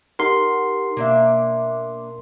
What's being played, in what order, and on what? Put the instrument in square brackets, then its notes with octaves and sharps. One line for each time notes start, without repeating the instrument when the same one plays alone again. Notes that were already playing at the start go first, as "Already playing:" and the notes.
[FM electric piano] D#4 G4 F#5 [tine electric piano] A#4 C6
[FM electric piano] B2 [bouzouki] A#3 D4 E5